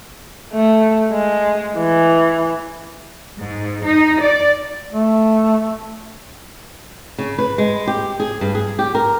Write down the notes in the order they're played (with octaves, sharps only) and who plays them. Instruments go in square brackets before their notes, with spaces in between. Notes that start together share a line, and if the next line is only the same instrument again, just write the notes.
[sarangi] A3
G#3
E3
[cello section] G#2
D#4
D5
[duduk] A3
[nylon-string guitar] C#3
B4
G#3
G4
G#4
G2
G#4
G4
A#4